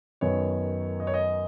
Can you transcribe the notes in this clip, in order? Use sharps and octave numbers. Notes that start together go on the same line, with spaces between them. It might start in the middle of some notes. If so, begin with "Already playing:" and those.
F#2 D#3 B3 C#5
D#5
C#5
D#5